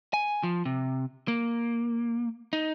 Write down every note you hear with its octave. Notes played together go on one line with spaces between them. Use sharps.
G#5
F3
C3
A#3
D#4